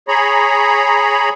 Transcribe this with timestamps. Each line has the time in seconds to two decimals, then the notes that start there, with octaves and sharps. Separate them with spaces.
0.08 G#4 C#5 A#5 B5